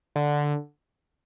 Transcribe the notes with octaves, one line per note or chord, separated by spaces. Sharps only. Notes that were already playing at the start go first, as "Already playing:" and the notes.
D3